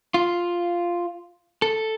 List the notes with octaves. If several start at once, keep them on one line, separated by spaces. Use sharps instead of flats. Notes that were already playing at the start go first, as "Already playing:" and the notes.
F4
A4